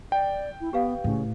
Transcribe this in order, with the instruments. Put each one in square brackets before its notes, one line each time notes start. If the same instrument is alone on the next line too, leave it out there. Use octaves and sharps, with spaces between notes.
[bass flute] D5 [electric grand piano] G5
[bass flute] E4
[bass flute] B3 [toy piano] G4 B4 F5
[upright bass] A2 [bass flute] C#3